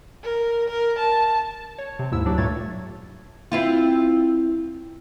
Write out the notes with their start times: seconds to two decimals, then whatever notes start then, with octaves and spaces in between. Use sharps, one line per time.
0.23 A#4
0.68 A#4
0.99 A5
1.78 C#5
1.99 C3
2.12 D#2 G#2 E4 E6
2.25 D2 F#3 D4 G4
2.38 G2 A#2 A3 C#5 G#6 A6
3.52 C4 E4 F4